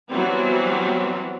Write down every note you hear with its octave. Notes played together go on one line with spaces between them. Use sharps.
E3 F#3 G3 B3 C4 E4